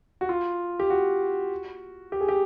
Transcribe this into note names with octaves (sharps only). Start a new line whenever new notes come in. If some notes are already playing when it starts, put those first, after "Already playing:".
F#4
F4
G4
F#4
G4
G#4
G4